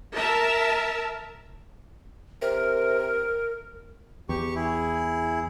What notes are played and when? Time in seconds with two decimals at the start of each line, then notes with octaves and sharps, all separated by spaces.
0.15 A#4 E5 A5
2.42 C3 A#4
4.29 E2 G4 C#6
4.55 E4 G#4